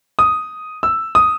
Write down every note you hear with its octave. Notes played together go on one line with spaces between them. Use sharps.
D#6
E6
D#6